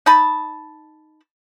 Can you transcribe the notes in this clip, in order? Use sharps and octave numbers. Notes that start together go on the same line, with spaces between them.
D#4 D#5 A5 B5